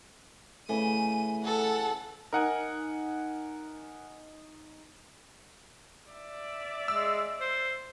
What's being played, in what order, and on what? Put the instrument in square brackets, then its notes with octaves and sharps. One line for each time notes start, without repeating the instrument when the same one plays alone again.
[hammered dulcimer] C#3 E3 [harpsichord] A3 [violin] D#7
[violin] A4 F#5
[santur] D#4 [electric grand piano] A#4 F#5 G#5
[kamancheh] D5 E5
[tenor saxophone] G#3 [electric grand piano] E6
[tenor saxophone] C5